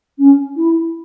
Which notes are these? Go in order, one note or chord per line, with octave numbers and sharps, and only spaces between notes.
C#4
E4